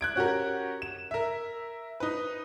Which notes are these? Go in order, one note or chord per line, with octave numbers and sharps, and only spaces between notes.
F#6 G#6 D7
C#4 F#4 G4 A#4
E7
A#4 E5
D#4 B4